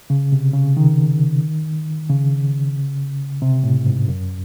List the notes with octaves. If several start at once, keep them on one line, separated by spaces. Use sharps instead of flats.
C#3
C3
C#3
D#3
C#3
C3
A2
G#2
F#2